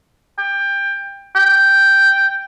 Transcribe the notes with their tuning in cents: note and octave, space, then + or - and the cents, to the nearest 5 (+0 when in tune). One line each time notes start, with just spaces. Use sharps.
G5 +20
G5 +0